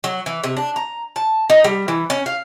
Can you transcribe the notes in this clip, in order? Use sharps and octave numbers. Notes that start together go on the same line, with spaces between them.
F#3
E3
C3
D4
A#5
A5
D#4
G3
E3
C#4
F5